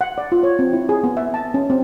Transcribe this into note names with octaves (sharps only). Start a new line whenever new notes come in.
F#5
D5
F4
C#5
C4
E4
G#4
B3
E5
A5
C#4
C4